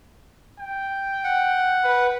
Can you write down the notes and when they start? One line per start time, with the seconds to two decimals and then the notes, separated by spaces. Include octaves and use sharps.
0.59 G5
1.24 F#5
1.84 B4